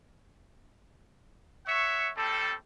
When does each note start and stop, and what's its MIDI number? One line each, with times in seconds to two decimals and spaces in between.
1.66 2.11 73
1.66 2.11 76
1.66 2.11 78
1.66 2.11 85
2.17 2.55 55
2.17 2.55 60
2.17 2.55 69